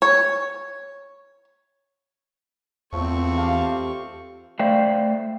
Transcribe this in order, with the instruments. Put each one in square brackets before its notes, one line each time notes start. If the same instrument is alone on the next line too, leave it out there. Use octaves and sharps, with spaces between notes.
[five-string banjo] C#5
[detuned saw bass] E2 [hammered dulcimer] F3 A3 [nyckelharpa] C4 C#6
[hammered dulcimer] G4 A5 [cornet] F5
[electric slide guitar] A3 C5 D5 F5 G5